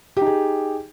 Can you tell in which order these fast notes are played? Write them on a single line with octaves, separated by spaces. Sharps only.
G4 D#4 G#4